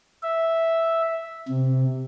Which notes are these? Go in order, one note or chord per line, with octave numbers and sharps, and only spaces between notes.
E5
C3